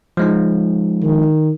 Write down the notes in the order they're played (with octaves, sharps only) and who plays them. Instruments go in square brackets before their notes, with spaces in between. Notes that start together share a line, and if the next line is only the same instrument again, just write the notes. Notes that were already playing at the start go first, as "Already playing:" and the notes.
[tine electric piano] F3 G#3 D#4
[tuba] D#3